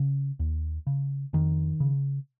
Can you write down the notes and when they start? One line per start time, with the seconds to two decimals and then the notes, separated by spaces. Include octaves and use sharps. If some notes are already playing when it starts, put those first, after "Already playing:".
Already playing: C#3
0.39 D#2
0.87 C#3
1.33 F2 D#3
1.80 C#3